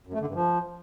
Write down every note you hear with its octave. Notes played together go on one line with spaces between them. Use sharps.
F#2
A3
D3
G2
F3